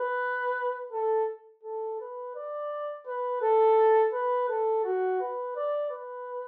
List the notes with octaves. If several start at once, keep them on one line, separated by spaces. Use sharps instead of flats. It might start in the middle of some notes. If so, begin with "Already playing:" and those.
Already playing: B4
A4
A4
B4
D5
B4
A4
B4
A4
F#4
B4
D5
B4